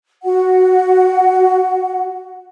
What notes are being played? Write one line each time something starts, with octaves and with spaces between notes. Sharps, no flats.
F#4 F#5